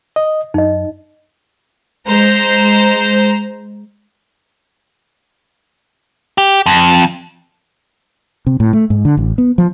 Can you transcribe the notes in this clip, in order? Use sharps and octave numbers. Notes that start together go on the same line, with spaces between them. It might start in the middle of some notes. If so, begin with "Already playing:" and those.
D#5
F#2 D#4 D#5
G#3 C5 A#5
G4
F2
C3
A2
A3
G#2
D3
A1
B3
F3